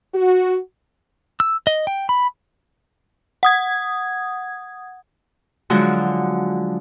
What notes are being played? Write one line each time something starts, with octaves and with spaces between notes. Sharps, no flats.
F#4
E6
D#5
G5
B5
F#5 D#6 G#6
D3 F3 F#3 G#3 F#4